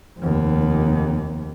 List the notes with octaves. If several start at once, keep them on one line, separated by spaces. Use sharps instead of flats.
F1 D#2